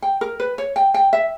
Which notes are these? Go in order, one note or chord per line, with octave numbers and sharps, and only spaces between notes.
G5
A#4
B4
C#5
G5
G5
E5